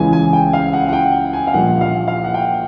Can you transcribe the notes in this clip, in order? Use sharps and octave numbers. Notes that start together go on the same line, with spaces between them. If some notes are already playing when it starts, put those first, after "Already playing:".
Already playing: C#2 C#3 E3 G#5
G#5
G5
F5
F#5
F#5
G5
G#5
F5
A#1 A#2 G3 A#3 F#5
F5
F5
F#5
G5